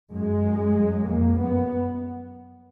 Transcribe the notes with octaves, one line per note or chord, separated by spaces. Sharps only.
F#2 G#3
F#2
F#2
F2 A#3
F#2 B3